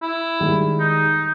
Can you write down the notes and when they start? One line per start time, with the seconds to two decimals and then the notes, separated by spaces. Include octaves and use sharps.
0.02 E4
0.40 D#3 G3 G#3
0.80 D#4